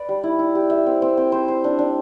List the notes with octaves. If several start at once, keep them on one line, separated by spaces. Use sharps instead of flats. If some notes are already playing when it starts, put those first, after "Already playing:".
Already playing: B4 D5
G3
E4
E4
G4
E5
C4
C4
C4
C5
C5
D4
D4